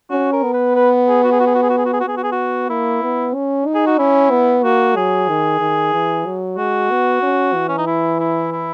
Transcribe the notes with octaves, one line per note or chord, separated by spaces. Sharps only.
C#4 F#4
A#4
B3
B4
B4
G#4
F#4
G#4
F#4
G#4
F#4
G#4
F#4
G#4
F#4
G#4
F#4
B3 G#4
F#4
G#4
F#4
A#3 E4
B3
C#4
D#4
G#4
F#4
C#4 E4
B3
A#3 F#4
F#3 G#4
D#3
D#3
E3
F#3
G#3 F#4
B3
C#4
E3
C#4
D#4
E4
E4
E4